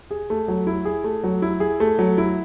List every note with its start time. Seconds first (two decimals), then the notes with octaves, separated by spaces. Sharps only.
0.11 G#4
0.30 A3
0.48 F#3
0.67 E4
0.85 G#4
1.04 A3
1.24 F#3
1.42 E4
1.60 G#4
1.80 A3
1.99 F#3
2.18 E4